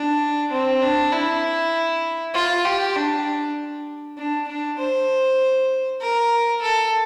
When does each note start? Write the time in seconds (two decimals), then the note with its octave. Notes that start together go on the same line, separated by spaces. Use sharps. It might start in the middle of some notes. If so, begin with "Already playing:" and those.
Already playing: D4
0.51 C4
0.82 D4
1.12 E4
2.34 F4
2.65 G4
2.96 D4
4.17 D4
4.48 D4
4.79 C5
6.01 A#4
6.62 A4